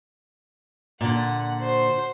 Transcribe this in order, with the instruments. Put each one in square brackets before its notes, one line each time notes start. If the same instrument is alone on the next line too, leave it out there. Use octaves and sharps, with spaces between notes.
[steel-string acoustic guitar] A#2 D3 [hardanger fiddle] F#5
[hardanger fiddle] F#4 C5